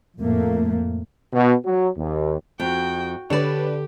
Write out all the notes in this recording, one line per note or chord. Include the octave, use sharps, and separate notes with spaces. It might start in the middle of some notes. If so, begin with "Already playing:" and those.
F2 A2 A3 A#3
B2
F#3
D#2
F2 F#4 G5
D3 D4 G4 B4 C#5 D5 E7